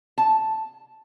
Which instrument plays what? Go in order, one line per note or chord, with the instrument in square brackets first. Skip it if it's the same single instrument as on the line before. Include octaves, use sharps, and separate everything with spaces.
[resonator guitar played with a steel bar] A5